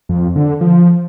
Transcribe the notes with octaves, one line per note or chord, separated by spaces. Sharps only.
F2
D3
F3